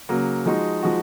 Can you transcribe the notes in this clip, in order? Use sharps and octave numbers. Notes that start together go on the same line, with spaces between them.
C#3 F#3 A#3
F3 G#3 D#4 F#4
F3 G#3 D#4 F#4